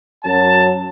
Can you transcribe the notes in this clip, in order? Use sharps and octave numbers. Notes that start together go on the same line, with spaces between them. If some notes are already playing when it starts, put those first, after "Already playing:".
F#2 F#3 A5